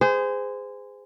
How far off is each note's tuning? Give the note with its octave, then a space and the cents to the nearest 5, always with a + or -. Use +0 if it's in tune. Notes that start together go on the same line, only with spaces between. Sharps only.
G#4 -15 C5 -30